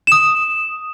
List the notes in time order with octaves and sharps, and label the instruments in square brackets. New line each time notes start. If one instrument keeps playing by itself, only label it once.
[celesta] D#6 E7